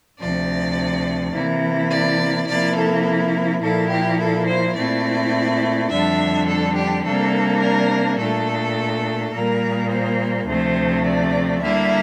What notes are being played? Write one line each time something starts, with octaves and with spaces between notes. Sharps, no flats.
D2 C3 F3 D5
C3 E3 A#3 E4
D5
C3 F3 A#3 E4 D5
A4
A#2 F3 A#3 E4 A4
G4
A4
C5
A#2 A3 C4 E4 D5
F2 D3 G3 D4 E5
A4
G4
C3 G3 A#3 D4 A4
A#4
A#2 A3 D4 A4
A#2 G3 A#3 A#4
C5
D2 C3 F3 A3 C5
D5
D3 G3 A#3 E4 E5